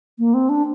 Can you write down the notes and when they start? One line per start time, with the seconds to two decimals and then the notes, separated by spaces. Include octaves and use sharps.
0.19 A#3
0.34 C4
0.49 D4